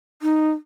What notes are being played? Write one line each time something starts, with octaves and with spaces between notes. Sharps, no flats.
D#4